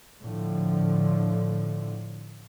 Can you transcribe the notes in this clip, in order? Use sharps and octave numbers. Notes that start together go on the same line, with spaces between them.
A2 D3 F3